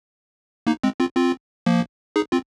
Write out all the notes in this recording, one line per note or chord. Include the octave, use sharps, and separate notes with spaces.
A#3 D#4
G#3 C4
C4 F4
C4 F4
F3 A#3
D#4 G#4
C4 F4